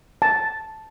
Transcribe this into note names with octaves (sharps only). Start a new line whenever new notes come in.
A5